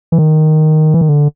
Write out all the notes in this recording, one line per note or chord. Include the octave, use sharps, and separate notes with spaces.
E3
D#3
E3
D#3
D3